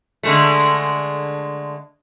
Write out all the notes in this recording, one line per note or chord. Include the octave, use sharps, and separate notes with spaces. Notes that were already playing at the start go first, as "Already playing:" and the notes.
D3 G#3 A3